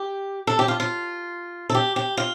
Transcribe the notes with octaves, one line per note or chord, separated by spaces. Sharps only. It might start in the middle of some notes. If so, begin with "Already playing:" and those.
Already playing: G4
A4
G4
F4
F4
A4
G4
G4
F4